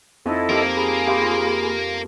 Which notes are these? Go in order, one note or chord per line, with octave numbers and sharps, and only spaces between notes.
F2 D#4 E4 A4 D#5
F3 A#3 G4 A#4 F6
F4 G#4 B5
G4 F5 C6